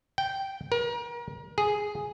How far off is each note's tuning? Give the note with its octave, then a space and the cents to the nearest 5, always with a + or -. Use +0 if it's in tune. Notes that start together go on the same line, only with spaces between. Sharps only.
G5 -10
A#4 +35
G#4 +0